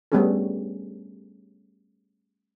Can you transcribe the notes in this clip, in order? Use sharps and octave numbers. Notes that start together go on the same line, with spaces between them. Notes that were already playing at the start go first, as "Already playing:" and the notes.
G3 A3 B3 C#4 G#4 A4